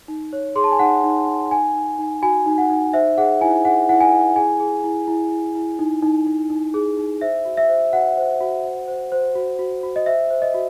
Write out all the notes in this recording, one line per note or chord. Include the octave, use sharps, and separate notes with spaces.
D#4
C#5
G#4 C6
A5
G#5
D#4 F#5
D#4
D#4
D#4 G#5
D#4
D#4
F#4 G#5
D#4
F#5
D#4
C5 E5
G#4 F#5
E4 G#5
G#4 F#5
E4 F#5
G#5
E4
G#4 G#5
G#4
E4
E4
E4
E4
D#4
D#4
D#4
D#4
G#4
D#4
C5 E5
F#4
E5
C5
F#4 F#5
C5
F#4
C5
C5
C5
F#4
F#4
F#4
D#5
C5 E5
C5
D#5
F#4